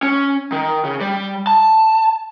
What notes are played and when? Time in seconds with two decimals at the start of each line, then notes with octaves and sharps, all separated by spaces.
0.03 C#4
0.52 D#3
0.85 C#3
1.01 G3
1.47 A5